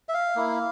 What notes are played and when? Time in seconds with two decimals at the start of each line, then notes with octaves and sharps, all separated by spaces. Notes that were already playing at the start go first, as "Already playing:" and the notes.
0.09 E5
0.14 F5
0.36 A#3 E4